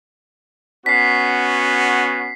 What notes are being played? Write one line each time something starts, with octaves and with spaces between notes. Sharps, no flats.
B3 C#4 F#4 B6 C7